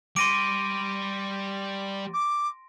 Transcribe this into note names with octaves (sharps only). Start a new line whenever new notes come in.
G3 C6 D6 A#6 D7 D#7
D6